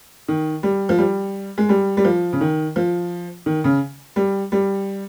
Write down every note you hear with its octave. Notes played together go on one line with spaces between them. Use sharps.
D#3
G3
F3
G3
G#3
G3
G3
F3
C#3
D#3
F3
D#3
C#3
G3
G3